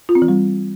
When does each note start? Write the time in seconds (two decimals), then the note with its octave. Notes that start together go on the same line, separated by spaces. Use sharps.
0.09 F4
0.15 C4
0.22 E3
0.28 G3